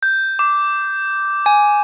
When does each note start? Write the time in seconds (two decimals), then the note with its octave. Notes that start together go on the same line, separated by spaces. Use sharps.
0.03 G6
0.39 D6
1.46 G#5